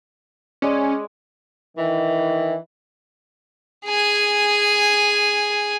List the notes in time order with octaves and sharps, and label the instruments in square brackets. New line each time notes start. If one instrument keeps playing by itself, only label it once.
[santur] G#3 D5 G#5 [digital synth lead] C#4
[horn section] D#3 E3
[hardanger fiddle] G#4 G#5